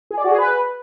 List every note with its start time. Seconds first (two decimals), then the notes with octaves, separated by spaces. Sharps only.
0.11 G#4
0.17 D5
0.24 F#4
0.31 G#4
0.38 B4